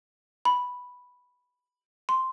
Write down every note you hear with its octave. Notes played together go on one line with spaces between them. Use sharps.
B5
C6